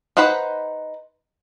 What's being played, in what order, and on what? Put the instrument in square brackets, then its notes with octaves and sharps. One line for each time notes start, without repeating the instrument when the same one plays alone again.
[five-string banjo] D#4 B4 C5 F#5 B5